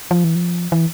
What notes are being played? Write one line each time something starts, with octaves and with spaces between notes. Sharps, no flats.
F3
E3
F3
E3